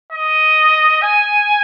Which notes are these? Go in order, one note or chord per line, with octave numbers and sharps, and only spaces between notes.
D#5
G#5